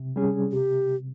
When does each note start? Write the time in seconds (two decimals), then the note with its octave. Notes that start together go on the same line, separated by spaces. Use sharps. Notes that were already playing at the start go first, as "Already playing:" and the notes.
Already playing: C3
0.16 G3 C#4 G#4
0.52 C3 G4